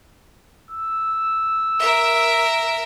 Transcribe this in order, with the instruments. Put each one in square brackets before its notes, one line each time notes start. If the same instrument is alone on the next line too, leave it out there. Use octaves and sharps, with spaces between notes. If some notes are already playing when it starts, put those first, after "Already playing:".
[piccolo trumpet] E6
[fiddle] A#4 E5